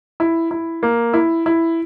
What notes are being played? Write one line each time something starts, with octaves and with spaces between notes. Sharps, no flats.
E4
E4
A#3
E4
E4